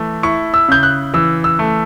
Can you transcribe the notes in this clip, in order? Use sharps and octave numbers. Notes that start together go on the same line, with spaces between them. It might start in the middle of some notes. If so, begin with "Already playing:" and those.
Already playing: E3 A3
E4 C#6
E6
C#3 G6
F#6
E3 E6
E6
A3